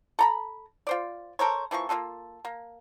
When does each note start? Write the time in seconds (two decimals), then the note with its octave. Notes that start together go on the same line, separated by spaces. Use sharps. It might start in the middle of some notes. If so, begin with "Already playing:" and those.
0.19 A4 A#5 B5
0.87 F4 C5 D5
1.39 A4 A#4 C5 C#5
1.71 E3 F3 A#3 C#6
1.89 A#3 D#4 F4 A4
2.45 A#3